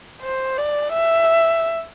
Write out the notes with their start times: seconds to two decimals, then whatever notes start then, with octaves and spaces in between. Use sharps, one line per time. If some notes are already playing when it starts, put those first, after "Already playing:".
0.22 C5
0.58 D5
0.94 E5